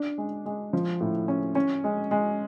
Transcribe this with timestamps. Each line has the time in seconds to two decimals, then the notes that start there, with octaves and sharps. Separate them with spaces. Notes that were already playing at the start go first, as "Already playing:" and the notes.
Already playing: D4
0.18 G#3
0.46 G#3
0.73 F3
1.01 A2
1.28 C#4
1.55 C#4
1.84 G#3
2.11 G#3